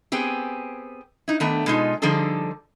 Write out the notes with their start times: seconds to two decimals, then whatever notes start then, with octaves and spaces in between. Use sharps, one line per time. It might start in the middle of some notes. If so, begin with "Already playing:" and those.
0.12 B3 C4 G4 G#4
1.28 D#4 E4
1.40 D#3 A3 B3 D4 E5
1.66 B2 G#3 D#4 F4
2.02 D3 F3 G3 D#4 G#4 A4